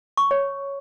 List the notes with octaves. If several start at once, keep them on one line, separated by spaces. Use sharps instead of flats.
C#6
C#5